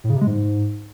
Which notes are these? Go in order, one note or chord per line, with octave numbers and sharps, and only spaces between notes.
A2
C#3
C3
G#3
G#2